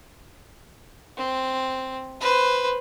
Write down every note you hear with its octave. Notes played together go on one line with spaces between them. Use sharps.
C4
B4 C5